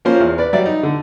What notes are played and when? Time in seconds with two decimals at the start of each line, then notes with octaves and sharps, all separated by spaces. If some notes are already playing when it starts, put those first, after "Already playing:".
0.05 F3 A#3 C#4 F4 C5
0.20 E2
0.38 B4 D5
0.53 F#3 G3 D5 E5
0.66 D#4
0.83 D3